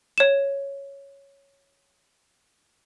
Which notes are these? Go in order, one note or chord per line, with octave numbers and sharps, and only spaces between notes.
C#5 E7